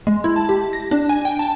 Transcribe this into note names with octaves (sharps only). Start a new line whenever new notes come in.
G#3
E4
A5
G4
A#6
D4
G#5
G5
A5